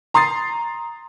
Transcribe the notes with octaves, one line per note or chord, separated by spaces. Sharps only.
A#5 C6 D#6 A6 C7